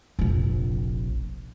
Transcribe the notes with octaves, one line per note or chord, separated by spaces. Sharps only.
F1 A#1